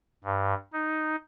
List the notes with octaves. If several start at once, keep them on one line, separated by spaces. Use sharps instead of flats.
G2
D#4